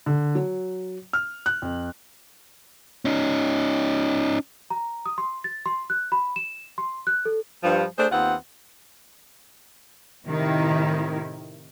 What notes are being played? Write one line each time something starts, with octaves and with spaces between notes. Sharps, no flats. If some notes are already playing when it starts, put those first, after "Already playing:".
D3
F#3
F6
F#6
F2
C#4 D#4
A#5
D#6
C6
A6
C6
F#6
B5
E7
C6
F#6
A4
G2 F3
A3 D4 G#4 C5
D#2 B3 C4 F4 F#5
A2 C3 D#3 E4